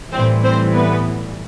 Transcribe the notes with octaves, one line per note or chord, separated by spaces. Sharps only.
A2 E3 G3 C4 C5
C4 C5
B3 B4